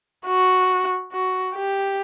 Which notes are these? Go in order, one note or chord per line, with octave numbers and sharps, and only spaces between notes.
F#4
F#4
G4